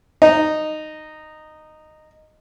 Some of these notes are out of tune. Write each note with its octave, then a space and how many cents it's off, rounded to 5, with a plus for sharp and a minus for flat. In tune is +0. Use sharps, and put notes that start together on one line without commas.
D#4 -10